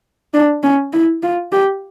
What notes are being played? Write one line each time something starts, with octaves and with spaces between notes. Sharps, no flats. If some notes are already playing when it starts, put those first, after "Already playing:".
D4
C#4
E4
F4
G4